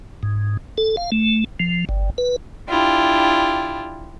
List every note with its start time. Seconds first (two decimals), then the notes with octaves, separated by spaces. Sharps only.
0.23 G#2
0.78 A4
0.97 F5
1.12 A3
1.60 F3
1.89 G1
2.18 B4
2.69 D4 E4 F4 G4